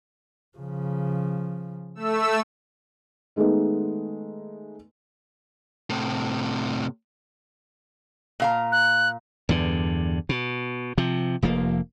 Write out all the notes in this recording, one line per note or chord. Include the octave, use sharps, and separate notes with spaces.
C#3 F3
A3 E6
D#3 G#3 A3 B3 D#4
A2 C3
A#2 F5 A#5
F#6
E2 G2 D3
B2
C3 F3
F1 F3 A#3